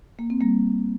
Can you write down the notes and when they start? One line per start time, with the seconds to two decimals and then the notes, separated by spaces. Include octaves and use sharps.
0.19 A#3
0.30 C4
0.41 G3 A#3